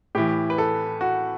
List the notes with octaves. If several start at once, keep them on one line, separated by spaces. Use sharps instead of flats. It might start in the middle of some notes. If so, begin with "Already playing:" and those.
A2 E3 G4
B4
A4
F#4